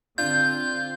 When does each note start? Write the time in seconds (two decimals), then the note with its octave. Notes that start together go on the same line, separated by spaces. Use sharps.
0.18 D3 C4 D4 F4 G6